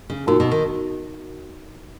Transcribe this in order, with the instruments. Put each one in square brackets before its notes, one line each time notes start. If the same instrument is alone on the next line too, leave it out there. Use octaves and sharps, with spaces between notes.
[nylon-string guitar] C#3
[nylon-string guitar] A#2 [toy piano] D#4 F#4 A#4
[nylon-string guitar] B2
D#3